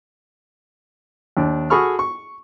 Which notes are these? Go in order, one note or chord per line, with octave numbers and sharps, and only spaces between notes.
D#2 D4
F#4 G#4 A4 B5 C#6 F6
C#6